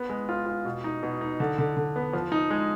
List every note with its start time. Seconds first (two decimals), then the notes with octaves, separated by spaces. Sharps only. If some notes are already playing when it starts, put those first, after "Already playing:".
Already playing: B3
0.09 G#3
0.29 F4
0.46 F4
0.65 B2
0.84 D#4
1.03 B2
1.21 D#4
1.40 D3
1.58 D3
1.77 D3
1.96 B3
2.13 F3
2.32 D#4
2.50 G#3